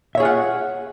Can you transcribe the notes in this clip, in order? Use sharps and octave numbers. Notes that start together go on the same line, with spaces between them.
F4 G#4 C#5 E5 F#5